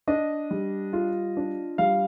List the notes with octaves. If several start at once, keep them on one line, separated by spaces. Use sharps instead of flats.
D4 D#5
G3
F4
D4
G3 F5